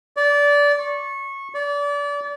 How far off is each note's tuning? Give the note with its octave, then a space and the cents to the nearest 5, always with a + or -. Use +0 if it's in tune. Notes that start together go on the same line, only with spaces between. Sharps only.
D5 -20
C#6 -20
D5 -30